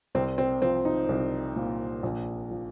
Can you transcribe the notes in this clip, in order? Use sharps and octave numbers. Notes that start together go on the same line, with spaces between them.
C2 C4
C4
F3 C4
D#4
C2
A#2
A#1
F3